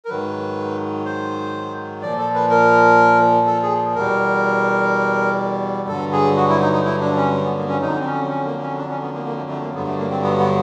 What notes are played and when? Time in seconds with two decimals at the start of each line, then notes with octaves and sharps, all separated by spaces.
0.05 A#4
0.09 G#2 D#3 F#3 B4
1.05 C5
2.02 A#2 F3 D5
2.18 A4
2.35 B4
2.50 A#4
3.47 A4
3.62 G#4
3.95 E2 B2 G3 A#4
5.88 G2 D3 F#3 A4
6.12 G#4
6.37 F#4
6.49 E4
6.61 D#4
6.73 D#4
6.85 E4
7.00 D4
7.17 C#4
7.44 B3
7.57 A#3
7.69 C#4
7.81 F2 D3 F#3 D#4
7.99 C4
8.05 C#4
8.29 C#4
8.45 A#3
8.62 C#4
8.78 D4
8.89 C#4
9.02 B3
9.14 A#3
9.26 A#3
9.37 A3
9.49 A3
9.62 A#3
9.74 G2 D3 F#3 B3
9.87 A3
9.98 A#3
10.10 C4
10.22 B3
10.38 B3